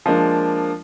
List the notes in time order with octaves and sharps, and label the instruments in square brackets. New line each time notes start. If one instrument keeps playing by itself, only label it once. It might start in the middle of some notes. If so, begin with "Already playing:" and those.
[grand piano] F3 G#3 A#3 D4